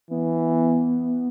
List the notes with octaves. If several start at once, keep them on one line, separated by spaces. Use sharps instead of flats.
E3 B3